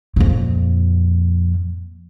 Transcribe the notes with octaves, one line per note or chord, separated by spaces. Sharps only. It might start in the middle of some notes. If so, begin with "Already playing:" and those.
F2 A#2